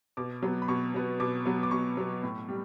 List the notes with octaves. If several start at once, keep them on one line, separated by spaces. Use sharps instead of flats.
B2 D6
F#3 B3
B5
B2 C#6
F#3 B3
B2 D6
F#3 B3
D6
B2 C#6
F#3 B3
A2
G3